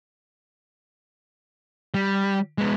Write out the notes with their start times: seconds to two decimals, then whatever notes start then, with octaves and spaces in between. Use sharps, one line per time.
1.94 G3
2.58 G#3 B3